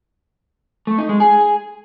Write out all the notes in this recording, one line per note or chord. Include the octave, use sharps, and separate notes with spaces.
A3
D#4
G#3
G#4